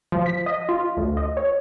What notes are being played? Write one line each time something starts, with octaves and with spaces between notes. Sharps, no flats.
F3
B6
D#5
F4
D2
D#5
C#5